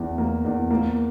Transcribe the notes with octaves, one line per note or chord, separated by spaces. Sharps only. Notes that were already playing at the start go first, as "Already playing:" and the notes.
Already playing: E2 E3
A#3
E2
A#3